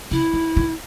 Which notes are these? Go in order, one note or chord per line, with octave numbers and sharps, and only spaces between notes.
C#3 E4
D#3
D#3